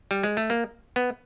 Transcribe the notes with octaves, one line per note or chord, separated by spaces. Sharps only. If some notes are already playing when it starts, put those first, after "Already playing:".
G3
G#3
A3
A#3
B3